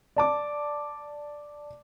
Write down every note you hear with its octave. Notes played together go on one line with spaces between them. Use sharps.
D5 A5 D6